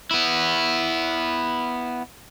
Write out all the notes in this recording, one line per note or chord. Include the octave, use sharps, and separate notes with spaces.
B3 E4